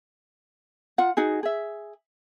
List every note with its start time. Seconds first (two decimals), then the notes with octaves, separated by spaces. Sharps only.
0.98 F4 F#5
1.17 D#4 F#4 G#4
1.43 G#4 E5